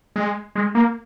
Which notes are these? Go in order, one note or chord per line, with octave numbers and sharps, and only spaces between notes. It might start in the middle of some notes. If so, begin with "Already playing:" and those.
G#3
G#3
A#3